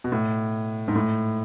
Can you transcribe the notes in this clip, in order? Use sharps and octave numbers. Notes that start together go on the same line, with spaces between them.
B2
A2
G#2
A2